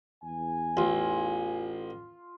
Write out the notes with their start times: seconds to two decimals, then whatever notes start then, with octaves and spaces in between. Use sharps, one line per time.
0.23 E2 G#5
0.77 A1 F4